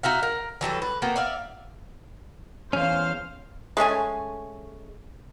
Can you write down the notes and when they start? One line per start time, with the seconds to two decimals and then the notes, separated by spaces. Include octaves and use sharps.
0.03 D#4 F#4 E5 F5
0.23 A#4
0.61 E3 F#3 G3 A4
0.82 B4
1.02 A#3 B3 F#4 G5
1.16 D5 E5 F5
2.73 E2 G2 C#4 C5 F5
3.77 G#3 A3 C#4 G#5